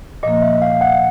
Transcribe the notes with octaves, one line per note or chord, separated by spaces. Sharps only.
A#2 F3 A#3 D#5
E5
F5
F#5